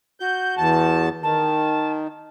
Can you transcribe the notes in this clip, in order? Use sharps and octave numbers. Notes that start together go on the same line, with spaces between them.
F#4 G6
E2 A5
D#3 A5